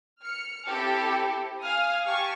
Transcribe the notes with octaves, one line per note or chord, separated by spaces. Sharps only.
F6 C#7
C4 E4 G4 A4
F5 G#5 D#6 F6
G4 G#5 A5 C#6